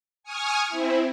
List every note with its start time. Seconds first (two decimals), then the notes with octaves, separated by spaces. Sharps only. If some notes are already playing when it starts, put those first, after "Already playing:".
0.23 G#5 C#6 D#6 F6
0.67 C4 E4